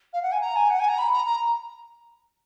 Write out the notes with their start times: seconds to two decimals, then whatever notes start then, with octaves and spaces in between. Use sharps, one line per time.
0.13 F5
0.23 F#5
0.32 G#5
0.41 A#5
0.56 G#5
0.70 F#5
0.79 G#5
0.88 A#5
0.98 B5
1.13 A#5
1.27 A#5